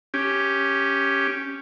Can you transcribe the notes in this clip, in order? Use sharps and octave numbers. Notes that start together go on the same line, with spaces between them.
C#4 G4